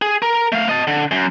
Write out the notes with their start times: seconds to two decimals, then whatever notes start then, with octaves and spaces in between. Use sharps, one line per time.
0.02 G#4
0.22 A#4
0.52 A3 F5
0.69 D#5 A5
0.87 D3
1.11 F#2